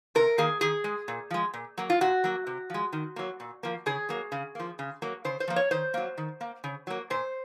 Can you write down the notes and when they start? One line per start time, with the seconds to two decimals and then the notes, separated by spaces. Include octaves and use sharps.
0.15 C3 A#4
0.38 D#3 A#3 G#4
0.61 D#3 G#4
0.84 G#3
1.08 A#2
1.30 F3 G#3
1.54 A#2
1.78 F#3 A#3
1.90 F4
2.01 A#2 F#4
2.24 F#3 A#3
2.47 C3
2.70 F3 G#3
2.93 D#3
3.16 F#3 A#3
3.40 A#2
3.63 F3 A#3
3.86 C#3 G#4
4.09 F#3 A#3
4.32 C#3
4.55 F3 A#3
4.79 C#3
5.02 F#3 A#3
5.25 C#3 C5
5.40 C5
5.48 F3 A#3
5.56 C#5
5.71 D#3 C5
5.94 F#3 A#3
6.18 D#3
6.41 A#3
6.64 C#3
6.87 F#3 A#3
7.10 A#2 C5